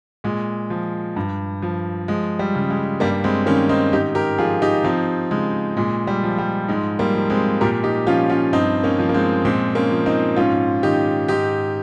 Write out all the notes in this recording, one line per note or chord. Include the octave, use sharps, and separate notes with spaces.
A#2 G#3
F3
G2
F3
F3 G#3
G3
C#3
G#3
G2 G3 A#3
G#3 C4
D#3 A#3 C#4
C4 D#4
G#2 D#4 G4
G4 A#4
F3 F4 G#4
D#4 G4
F3 C4 D#4
C#3 G#3
A#2 G#3
G3
F3
G3
G#2 G#3
G3 A#3
F3
G#3 C4
A#2 G4 A#4
D#4 G4
F3 C#4 F4
C#4 F4
G2 C4 D#4
A#3 C#4
F3
A#3
G#3 C4
A#2 G#3 C4
A#3 C#4
F3
C4 D#4
G#2 C#4 F4
D#3 D#4 G4
G#2 D#4 G4